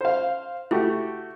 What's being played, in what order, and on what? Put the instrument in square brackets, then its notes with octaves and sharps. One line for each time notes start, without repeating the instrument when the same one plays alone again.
[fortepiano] C5 F5
[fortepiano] A3 F#4 G4 [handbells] E4